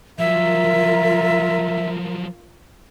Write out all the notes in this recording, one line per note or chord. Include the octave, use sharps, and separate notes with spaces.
F3 F#3 F4 A#4 E5